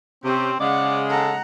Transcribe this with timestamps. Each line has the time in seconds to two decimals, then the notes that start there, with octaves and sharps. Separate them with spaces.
0.24 C3 C4 C#4 G4
0.60 C#3 G#3 D5 F#5
1.10 A4 F#5 A#5